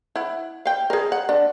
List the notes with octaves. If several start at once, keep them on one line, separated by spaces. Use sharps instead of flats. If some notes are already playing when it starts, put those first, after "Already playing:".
E4 F#5
F5 G5
G#4 A#4
F#5
D4